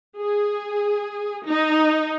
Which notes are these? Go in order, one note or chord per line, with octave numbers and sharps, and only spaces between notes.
G#4
D#4